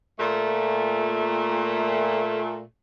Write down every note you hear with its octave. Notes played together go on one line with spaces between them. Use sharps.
A#2 A3